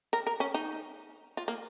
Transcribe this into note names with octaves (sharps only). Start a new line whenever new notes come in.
A#4
A#4
C#4
D#4
F4
A#3